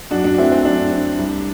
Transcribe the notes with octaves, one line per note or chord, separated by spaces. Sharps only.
F#2 D4 F#4
D4 F#4
F#3 A3 C4 E4
C4
F#2 D4
F#3 A3
C2